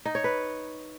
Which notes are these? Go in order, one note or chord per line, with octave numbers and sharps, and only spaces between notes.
D#4
C#5
B4